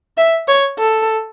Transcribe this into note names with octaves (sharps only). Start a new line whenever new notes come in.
E5
C#5
A4